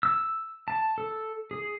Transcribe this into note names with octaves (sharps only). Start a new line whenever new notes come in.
E6
A5
A4
G#4